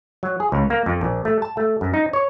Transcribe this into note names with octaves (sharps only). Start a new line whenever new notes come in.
F#3
G#4
C#2
A#3
F2
A#1
A3
A5
A3
F#2
D#4
C#5